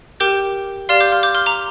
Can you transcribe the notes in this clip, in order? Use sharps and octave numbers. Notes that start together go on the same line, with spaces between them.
G4 A#4 G5 D6 G6
G4 D5 F5 C6 F6
D6 G6
C6 F6
D6 G6
C6 F6
A#5 D6